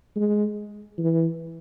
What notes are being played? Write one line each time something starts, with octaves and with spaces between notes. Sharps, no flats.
G#3
E3